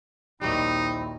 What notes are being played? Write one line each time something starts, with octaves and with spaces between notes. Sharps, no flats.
A#1 D#2 D#3 F#3 G3 C4 D#4 E4